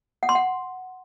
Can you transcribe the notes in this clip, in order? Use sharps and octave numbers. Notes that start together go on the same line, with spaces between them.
F#5
C6
F#5